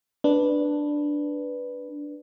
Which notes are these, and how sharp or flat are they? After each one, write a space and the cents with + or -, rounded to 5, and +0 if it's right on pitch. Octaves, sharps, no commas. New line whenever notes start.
D4 +0 B4 +0